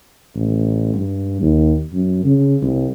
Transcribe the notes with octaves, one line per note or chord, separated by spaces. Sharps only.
A1
G2
D#2
F#2
C#3
C2